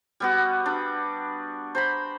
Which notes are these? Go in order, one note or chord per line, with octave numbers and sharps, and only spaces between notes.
G3 B3 F#4
D4
C5 A#5 B5